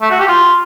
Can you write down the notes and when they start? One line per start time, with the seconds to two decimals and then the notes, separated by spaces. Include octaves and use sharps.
0.02 A3
0.11 F#4
0.19 G4
0.28 F4